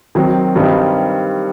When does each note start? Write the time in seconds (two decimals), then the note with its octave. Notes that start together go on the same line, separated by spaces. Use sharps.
0.15 D#3 F#3 C4
0.55 G2 D#3 G3 C4 D#4